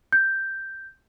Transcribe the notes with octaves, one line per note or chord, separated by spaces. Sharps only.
G6